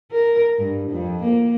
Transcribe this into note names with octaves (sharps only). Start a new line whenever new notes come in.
A#4
G2
F2
A#3